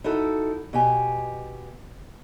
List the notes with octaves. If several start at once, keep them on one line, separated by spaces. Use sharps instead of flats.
D#4 E4 F#4 A4
B2 G4 G#5